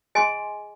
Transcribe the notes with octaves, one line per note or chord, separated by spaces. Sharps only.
G#4 D#5 G#5 C6